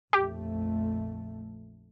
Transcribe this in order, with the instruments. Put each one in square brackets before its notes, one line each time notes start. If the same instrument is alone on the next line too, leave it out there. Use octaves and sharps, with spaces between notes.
[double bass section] A#1 F2 A3 [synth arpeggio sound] G4